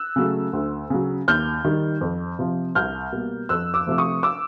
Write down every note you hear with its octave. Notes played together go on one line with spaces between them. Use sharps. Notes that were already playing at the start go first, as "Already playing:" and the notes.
Already playing: E6 F#6
C#3 F#3 A3
D2
C#3 F#3
D#2 F6 G6
D#3 G3
F2
C3 F3
C2 F6 G6
B2 G3 A#3
F2 E6 F#6
D6 E6
C3 F3 A3
C#6 D#6
D6 E6